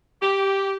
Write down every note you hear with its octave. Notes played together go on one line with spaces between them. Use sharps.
G4